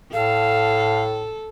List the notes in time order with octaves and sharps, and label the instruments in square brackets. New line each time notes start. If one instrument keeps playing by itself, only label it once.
[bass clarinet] A2 [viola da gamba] A4 [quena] F5